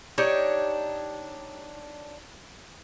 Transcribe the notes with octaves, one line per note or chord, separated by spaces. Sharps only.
D4 D#4 G4 C#5